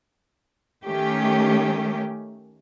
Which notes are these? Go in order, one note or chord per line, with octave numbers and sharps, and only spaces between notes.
D#3 A3 C#4 G4